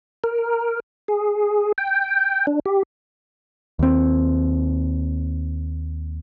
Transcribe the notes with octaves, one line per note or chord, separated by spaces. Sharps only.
A#4
G#4
G5
D4
G4
D#2 C4